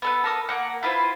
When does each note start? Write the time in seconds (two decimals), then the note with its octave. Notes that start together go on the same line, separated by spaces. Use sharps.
0.02 B3 A4 B4
0.24 A4 A#4 D#6
0.49 A#3 F#5
0.83 E4 F4 B4 C5